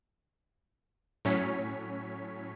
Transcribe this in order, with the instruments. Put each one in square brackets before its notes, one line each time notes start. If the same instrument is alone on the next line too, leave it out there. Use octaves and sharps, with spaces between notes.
[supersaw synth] A2 F#3 C#4 C#5 B6